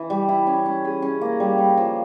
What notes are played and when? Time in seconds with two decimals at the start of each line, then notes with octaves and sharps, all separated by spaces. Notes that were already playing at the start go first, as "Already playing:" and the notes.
Already playing: E3
0.10 G3
0.28 E4
0.47 C#4
0.66 C#4
0.85 G#4
1.02 C#4
1.21 A#3
1.40 G3
1.58 G3
1.77 F3